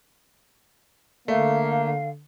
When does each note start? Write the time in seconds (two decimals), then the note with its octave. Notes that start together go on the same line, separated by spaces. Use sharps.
1.28 D3 A3 A#3 F5